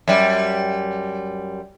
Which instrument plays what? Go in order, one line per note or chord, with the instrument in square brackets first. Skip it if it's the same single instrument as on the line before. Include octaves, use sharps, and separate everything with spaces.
[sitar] F#2 G3